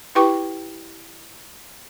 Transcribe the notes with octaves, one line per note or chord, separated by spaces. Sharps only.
E4 G4 B4 G5 C#6 D6